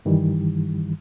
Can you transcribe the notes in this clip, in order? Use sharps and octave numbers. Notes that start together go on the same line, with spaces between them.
G2 D#3 E3 G3